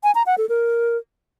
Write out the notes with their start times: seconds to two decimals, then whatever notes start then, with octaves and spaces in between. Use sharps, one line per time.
0.03 G#5
0.15 A#5
0.26 F#5
0.38 A4
0.49 A#4